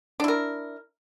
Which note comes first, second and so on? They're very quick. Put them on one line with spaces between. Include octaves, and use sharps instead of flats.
D4 E4 A#4